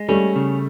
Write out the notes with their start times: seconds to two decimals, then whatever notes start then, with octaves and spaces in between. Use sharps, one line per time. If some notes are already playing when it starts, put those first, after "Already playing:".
Already playing: G#3
0.09 G3 A3 C#4
0.36 C#3